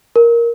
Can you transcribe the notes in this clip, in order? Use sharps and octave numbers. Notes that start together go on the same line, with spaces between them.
A#4